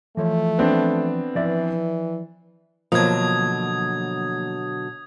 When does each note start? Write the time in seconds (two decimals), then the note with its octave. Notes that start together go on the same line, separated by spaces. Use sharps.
0.17 E3 F3 A3 C#5
0.58 B3 C4 D4
1.35 E3 F3 D5 E5
2.92 B2 D3 F3 F#3 A#3 D#6 G#6